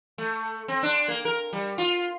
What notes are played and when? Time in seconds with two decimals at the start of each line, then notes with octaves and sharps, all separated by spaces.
0.18 A3
0.68 C4
0.83 D4
1.08 A#3
1.25 A#4
1.53 G3
1.78 F4